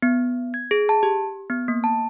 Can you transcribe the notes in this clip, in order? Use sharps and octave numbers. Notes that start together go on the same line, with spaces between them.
B3
G#6
G#4
A5
G4
B3
A#3
A5